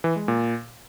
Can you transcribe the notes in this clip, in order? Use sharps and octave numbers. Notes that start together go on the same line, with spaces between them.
E3
G#3
A#2